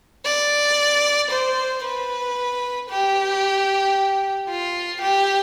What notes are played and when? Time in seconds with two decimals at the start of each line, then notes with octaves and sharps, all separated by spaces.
0.25 D5
1.31 C5
1.84 B4
2.90 G4
4.49 F4
5.01 G4